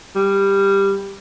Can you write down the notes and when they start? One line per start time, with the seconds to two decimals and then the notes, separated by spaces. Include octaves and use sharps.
0.16 G3